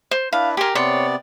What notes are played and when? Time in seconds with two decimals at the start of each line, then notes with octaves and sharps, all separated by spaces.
0.11 C5
0.33 D4 E4 B4 F5
0.57 G4 A#4 G#5 C6
0.75 C3 B3 C#5 D5 C6